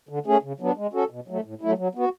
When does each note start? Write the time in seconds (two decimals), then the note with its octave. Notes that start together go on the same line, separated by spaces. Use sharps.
0.09 D3
0.26 A3 C#4 G#4
0.43 C#3
0.60 F#3 B3 D4
0.77 G#3
0.93 C#4 F#4 A4
1.10 B2
1.28 F#3 A3
1.44 A2
1.61 F#3 A3 E4
1.78 F#3
1.95 B3 F#4